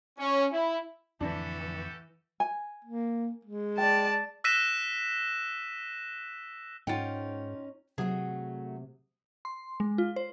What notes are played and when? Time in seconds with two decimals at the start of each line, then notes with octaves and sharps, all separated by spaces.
0.19 C#4
0.53 E4
1.21 F2 A2 D3 E3 D4 F#4 G4 A4
2.40 G#5
2.85 A#3
3.45 G#3
3.78 D5 G5 A5
4.44 E6 F#6 A#6 B6 D#7 E7
6.87 G#2 C#4 D#4 F4 F#5 G5
7.98 C3 F#3 A3 G#4
9.45 C6
9.80 G#3
9.98 F4
10.16 C5